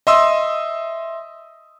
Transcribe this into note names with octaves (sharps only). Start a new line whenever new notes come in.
D#5 E5 C6 D#6 E6